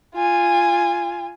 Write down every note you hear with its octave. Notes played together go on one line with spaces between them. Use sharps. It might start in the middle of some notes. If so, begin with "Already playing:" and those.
F4 G#5